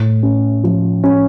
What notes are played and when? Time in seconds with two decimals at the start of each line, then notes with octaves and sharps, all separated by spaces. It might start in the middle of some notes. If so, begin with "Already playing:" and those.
Already playing: A2
0.23 C#4
0.64 F3
1.04 C#4